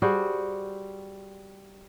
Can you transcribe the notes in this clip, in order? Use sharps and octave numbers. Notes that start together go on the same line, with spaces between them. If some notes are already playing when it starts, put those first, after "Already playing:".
G3 F#4 G#4 C5